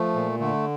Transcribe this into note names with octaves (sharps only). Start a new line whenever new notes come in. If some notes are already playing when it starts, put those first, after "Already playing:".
Already playing: F3 A3
A#2
D3 A3